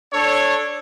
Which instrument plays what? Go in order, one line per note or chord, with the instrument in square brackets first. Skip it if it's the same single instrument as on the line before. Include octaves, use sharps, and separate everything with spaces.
[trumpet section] D4 A4 C#5